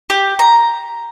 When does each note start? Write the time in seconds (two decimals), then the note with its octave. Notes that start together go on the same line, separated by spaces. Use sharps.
0.10 G4
0.39 A#5